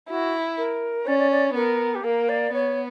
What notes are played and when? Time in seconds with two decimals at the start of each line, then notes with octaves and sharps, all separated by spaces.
0.09 E4 F#4
0.57 A#4
1.06 C#4 D5
1.18 D5
1.31 D5
1.55 B3 A#4
1.95 G4
2.04 A#3 A#4
2.29 D5
2.53 B3 C#5